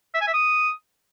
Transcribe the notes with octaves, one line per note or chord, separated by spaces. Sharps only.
E5
G#5
E5
D#6